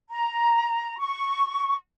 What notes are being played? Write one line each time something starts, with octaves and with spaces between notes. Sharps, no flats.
A#5
C#6